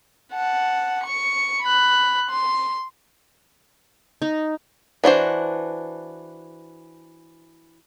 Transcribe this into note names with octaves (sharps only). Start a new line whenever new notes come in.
F#5 A5
C#6 C#7
B5 F#6
C6
D#4
E3 D4 F#4 C5